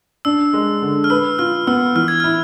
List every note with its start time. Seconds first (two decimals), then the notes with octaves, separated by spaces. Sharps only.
0.25 D4 E6
0.53 G#3
0.82 D3
1.04 F6
1.10 B4 E6
1.39 F4 F6
1.67 B3 E6
1.95 E3 F6
2.08 G#6
2.20 F6
2.24 E4